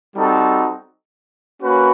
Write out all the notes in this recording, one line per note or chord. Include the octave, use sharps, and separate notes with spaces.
G3 C4 D#4 F#4 A4
A#3 C#4 F#4 B4